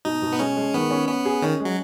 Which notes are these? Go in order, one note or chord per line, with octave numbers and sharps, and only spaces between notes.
B2 D#4
B2
B3
G#3 C#4
G#3
D#3 B3
C#4
B3 C#4
G#4
D#3 C#4
G#3
F#3